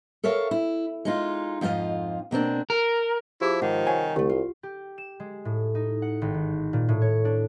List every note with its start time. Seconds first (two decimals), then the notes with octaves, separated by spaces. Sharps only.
0.24 A4 A#4 C#5 E5 F5
0.51 E4
1.05 G#3 D#4 F4
1.61 F2 G#2 G#3 F4 D#5
2.31 B2 A#3 C4 D4
2.70 A#4
3.41 F3 E4 G4 G#4 D6
3.62 G#2 D#3 F#5
3.87 C2 C#5 F#5 G#5
4.16 C2 D3 A3 G4
4.29 F4
4.63 G4
4.98 E7
5.20 G#3
5.45 A2
5.75 D#4
6.02 F#5
6.22 G#1
6.34 D#3
6.73 A#2
6.89 A2
7.02 C#5
7.25 D4